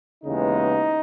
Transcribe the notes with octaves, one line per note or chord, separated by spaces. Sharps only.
D#2 C#3 E3 G#3 B3 D#4